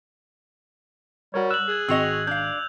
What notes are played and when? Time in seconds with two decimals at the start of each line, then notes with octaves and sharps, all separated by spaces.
1.34 G3 F#4 A#4 C#5
1.51 E6 F#6 F#7
1.68 G#4 F#6 G#6
1.88 G#1 C4 F#4 D#5 E6 F7
2.27 D4 F5 G6